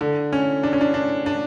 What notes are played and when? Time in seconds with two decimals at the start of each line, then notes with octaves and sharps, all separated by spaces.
0.01 D3
0.33 C#4
0.63 D4
0.73 C#4
0.81 D4
0.94 D4
1.26 D4